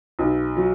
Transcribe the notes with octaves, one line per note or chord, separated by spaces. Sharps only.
B1
F#3